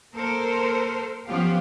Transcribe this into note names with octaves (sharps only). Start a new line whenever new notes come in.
A#3 A4 A#4 C5
F3 B3 C#4 F4 G4 F5